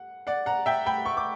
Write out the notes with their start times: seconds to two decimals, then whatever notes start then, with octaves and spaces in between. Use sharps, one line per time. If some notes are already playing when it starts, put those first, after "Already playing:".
Already playing: F#5
0.27 D5 F#5
0.46 F#5 A#5
0.66 E5 G5
0.86 G5 B5
1.06 C#6
1.17 D6